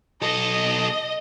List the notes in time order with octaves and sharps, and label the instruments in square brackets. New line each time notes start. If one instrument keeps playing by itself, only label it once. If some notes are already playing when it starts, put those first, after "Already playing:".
[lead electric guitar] B1 A4 [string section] D#5